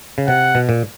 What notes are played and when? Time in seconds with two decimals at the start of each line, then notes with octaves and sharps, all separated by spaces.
0.18 C#3
0.28 C3 F#5
0.55 B2
0.69 A#2